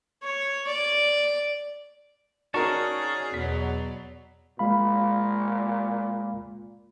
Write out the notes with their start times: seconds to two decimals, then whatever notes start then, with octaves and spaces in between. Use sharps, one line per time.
0.22 C#5
0.66 D5
2.54 C#4 D#4 F#4 G#4 A#4 D5 A5 C#6
3.34 E2 B2 F#3 B6
4.59 A#2 G#3 F5 B5